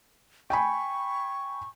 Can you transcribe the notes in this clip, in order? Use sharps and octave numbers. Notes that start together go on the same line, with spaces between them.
G5 G#5 B5 C#6